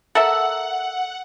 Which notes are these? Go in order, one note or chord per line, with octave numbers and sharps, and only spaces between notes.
A4 A#4 E5 F#5